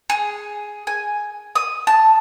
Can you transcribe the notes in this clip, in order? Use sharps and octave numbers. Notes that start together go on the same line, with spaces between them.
G#4
G#5
D#6
A5